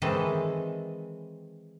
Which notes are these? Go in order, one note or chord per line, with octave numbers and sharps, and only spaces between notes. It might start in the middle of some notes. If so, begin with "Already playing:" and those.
D#3 E3 G#3 C4 A4